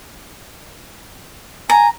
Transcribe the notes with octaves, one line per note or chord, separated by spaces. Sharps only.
G#5 A#5